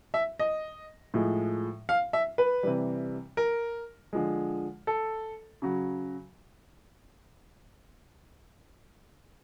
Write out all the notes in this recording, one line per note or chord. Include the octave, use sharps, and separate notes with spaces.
E5
D#5
A2 F3 G#3
F5
E5
B4
C3 E3 G3
A#4
D3 F3 G#3
A4
C#3 F#3